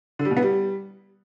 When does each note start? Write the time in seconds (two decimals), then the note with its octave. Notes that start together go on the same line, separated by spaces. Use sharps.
0.19 D3
0.25 G3
0.31 B2
0.37 B3
0.42 G3